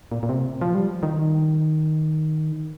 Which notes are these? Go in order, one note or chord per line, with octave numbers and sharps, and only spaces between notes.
A#2
A#2
C3
F3
G3
D#3